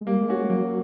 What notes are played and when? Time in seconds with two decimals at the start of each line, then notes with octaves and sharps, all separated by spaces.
0.01 G#3
0.07 G3 A#3
0.21 G#3
0.29 C#4 F#4
0.35 G#3
0.50 F#3 A#3